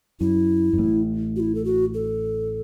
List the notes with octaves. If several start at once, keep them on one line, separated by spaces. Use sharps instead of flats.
F#2 E4
F#2
A1 A2
F#4
E4
A4
F#4
A4